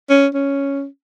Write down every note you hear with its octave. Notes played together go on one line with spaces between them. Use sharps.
C#4
C#4